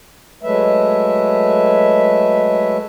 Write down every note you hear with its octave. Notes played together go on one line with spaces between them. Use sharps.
F#3 G#3 A3 B4 E5